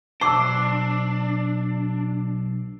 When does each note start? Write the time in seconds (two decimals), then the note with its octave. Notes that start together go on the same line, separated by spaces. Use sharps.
0.21 B1 G#2 D4 C5 A5 D6 E6 C7